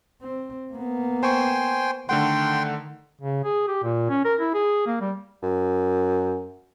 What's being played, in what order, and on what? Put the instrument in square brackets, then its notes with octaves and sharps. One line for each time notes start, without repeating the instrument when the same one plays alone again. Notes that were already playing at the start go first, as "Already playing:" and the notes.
[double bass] C4
A#3 B3
[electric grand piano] C5 C#6 [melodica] G5 G#5 C6
[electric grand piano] D3 A3 F#5 [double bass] D#3 [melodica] G5 C6
[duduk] C#3
G#4
G4
A#2
C#4
A#4
E4
G#4
A#3
G3
[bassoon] F#2